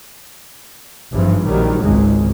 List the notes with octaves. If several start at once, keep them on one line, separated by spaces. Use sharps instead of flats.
G#1 G2 E3 F3
A#1 D#3 F#3 G3
G#1 C#2 G#3